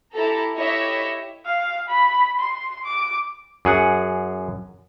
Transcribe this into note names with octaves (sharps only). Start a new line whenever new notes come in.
E4 G4 A4 A#5
E4 G4 C#5 D#5 E5
F5
B5
C6
D6
F#2 G#4 F#5